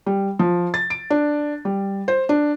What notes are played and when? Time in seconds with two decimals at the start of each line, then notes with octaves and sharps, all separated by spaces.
0.06 G3
0.39 F3
0.74 A6
0.90 D7
1.10 D4
1.65 G3
2.08 C5
2.29 D4